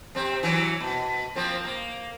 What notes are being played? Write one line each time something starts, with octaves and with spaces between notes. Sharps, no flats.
C3 C4
E3 F#3
B2
F3 A#3 C4
A#3